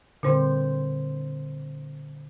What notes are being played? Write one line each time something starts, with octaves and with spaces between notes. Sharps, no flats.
A#2 D3 G3 C4 C5